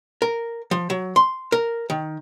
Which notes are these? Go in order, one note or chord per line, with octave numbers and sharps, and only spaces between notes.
A#4
F3
F#3
C6
A#4
D#3